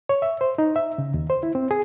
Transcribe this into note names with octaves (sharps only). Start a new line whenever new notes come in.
C#5
E5
C5
D#4
E5
C#3
D#2
C5
E4
C4
G#4